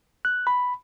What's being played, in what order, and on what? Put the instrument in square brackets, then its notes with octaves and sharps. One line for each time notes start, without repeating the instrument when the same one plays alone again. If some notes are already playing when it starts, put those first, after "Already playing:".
[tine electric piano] F#6
B5